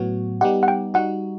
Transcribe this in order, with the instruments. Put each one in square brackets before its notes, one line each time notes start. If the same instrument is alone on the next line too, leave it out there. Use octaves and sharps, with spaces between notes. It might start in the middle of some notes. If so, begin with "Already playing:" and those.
Already playing: [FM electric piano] A2 F#3 B3 F#4
[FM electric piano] G3 B3 D#4 G4 [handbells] F#5
[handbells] F#5
G5
[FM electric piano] G3 D#4 F#4 [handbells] F#5